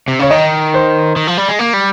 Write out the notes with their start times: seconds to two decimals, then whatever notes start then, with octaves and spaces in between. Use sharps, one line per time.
0.08 C3
0.19 C#3 C#5
0.31 D#3 D#5
0.74 C5
1.16 D#3
1.27 F3
1.37 G3
1.49 G#3
1.59 A#3
1.73 G3